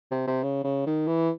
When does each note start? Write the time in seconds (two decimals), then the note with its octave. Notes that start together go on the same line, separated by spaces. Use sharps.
0.11 C3
0.28 C3
0.43 C#3
0.64 C#3
0.86 D#3
1.08 E3